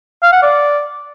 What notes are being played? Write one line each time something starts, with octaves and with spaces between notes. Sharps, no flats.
F5
F#5
D5